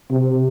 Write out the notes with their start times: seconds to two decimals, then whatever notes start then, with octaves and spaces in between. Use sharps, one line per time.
0.11 C3